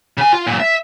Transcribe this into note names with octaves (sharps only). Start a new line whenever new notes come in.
C#3 G#5
F4
F#2 A#2
E5